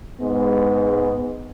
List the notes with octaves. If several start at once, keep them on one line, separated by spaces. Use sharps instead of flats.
G#2 G#3 B3